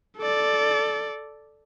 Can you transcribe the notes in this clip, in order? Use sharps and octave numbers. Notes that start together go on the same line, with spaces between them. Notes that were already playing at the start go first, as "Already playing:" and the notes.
A4 D5